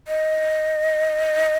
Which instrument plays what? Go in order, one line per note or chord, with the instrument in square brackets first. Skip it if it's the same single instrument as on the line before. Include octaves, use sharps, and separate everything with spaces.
[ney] D#5